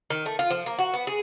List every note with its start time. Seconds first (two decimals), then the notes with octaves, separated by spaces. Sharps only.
0.10 D#3
0.26 A3
0.39 F4
0.51 F3
0.66 A#3
0.79 F#4
0.94 B3
1.07 G#4